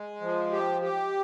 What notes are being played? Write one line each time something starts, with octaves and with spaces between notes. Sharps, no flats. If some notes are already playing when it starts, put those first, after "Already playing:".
Already playing: G#3
F3
G4
G4